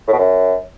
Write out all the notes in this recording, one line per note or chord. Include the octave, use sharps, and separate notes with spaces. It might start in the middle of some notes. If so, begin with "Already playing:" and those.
A2
B2
F#2